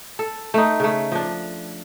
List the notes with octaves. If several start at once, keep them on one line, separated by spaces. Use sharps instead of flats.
A4
A3 D#4
C#3 A3
F3 D4